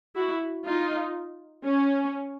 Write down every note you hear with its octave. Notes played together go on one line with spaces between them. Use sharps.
E4 F#4
D#4 F4
C#4